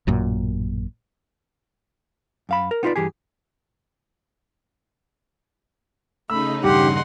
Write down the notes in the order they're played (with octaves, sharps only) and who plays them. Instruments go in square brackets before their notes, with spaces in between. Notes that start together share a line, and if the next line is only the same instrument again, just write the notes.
[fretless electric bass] A1 F#2 A#2
[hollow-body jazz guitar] F#2 F5 B5
A#4
B3 D#4 F4 G4 B4 D5
G2 E3 G4 G#4
[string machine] C#3 D#4 [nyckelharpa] A3 B5 [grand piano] E6
[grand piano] E1 G2 [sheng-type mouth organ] G4 [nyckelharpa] F#5 C6